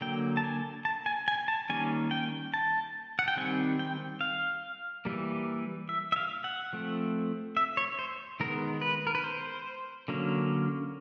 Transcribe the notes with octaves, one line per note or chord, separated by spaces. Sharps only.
D3 F#3 A#3 G5
A5
G#5
A5
G#5
G#5
A5
D#3 G3 A#3 C#4 G#5
G5
A5
F#5
G5
D#3 G3 C4 G#5
G5
F5
E3 G3 A#3
E5
E5
F5
F#5
F3 A3 C4
E5
C#5
C5
D#3 G#3 B3 A#4
B4
A#4
B4
C5
D3 F#3 A#3 C#4